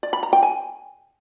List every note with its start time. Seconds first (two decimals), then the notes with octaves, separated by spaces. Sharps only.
0.03 D5
0.13 B5
0.23 A#5
0.33 G5
0.43 G#5